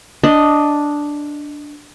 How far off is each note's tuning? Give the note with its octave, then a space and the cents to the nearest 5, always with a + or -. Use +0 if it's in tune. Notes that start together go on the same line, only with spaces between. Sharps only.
D4 +0 D#5 +0